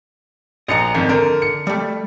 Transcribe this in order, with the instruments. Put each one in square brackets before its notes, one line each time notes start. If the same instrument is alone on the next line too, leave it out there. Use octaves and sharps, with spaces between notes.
[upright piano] A#1 C#7 [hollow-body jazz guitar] D#5 A#5
[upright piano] G#1 F2
[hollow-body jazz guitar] D3 [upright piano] A#4
[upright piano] C#7
[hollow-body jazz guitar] G3 A3